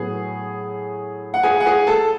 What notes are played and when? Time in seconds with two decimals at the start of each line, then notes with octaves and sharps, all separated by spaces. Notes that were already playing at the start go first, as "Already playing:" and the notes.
Already playing: A2 F#3 B3 G#4
1.34 F#5
1.43 G#4 G#5
1.60 F#5
1.66 G#4 G#5
1.87 A4 A5